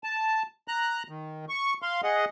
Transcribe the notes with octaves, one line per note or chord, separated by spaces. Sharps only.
A5
A#5 F#6
D#3
C#6
F5 C6
G#4 D#5 F#5